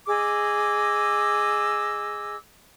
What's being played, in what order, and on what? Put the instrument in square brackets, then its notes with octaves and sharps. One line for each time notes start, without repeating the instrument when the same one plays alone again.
[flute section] G#4 D#5 D6 E6